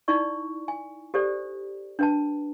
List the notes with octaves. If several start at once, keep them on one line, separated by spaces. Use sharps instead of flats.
D#4 E4 D5 C#6
G#5
G4 A4 C5 D5
D4 B4 A5